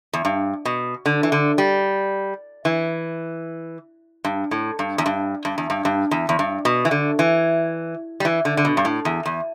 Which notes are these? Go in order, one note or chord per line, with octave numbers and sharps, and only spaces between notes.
E2
G2
B2
D3
E3
D3
G3
E3
G2
A2
G2
E2
G2
G2
E2
G2
G2
E2
E2
G2
B2
E3
D3
E3
G3
E3
D3
D3
B2
G2
A2
E2
E2